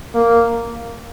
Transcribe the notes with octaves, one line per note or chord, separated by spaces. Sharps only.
A#3